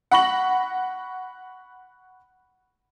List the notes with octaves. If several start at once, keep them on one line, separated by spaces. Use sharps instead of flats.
F#5 B5 C#6 A#6 F#7